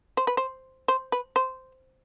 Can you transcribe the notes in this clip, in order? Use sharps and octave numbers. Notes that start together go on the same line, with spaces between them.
C5
B4
C5
C5
B4
C5